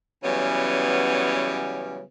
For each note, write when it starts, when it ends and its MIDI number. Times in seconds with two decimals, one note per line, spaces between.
0.23 2.03 49
0.23 2.03 52
0.23 2.03 54
0.23 2.03 55
0.23 2.03 59
0.23 2.03 61